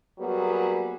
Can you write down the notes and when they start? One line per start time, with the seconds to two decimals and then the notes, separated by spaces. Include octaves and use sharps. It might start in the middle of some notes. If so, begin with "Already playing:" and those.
0.19 F#3 G3 A#3 B3 F#4 G#4